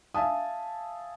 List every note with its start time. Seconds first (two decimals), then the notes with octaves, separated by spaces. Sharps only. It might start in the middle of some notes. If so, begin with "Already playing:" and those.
0.14 E5 F5 G#5 A5 D#6